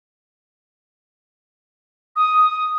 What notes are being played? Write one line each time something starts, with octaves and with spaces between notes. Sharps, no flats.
D#6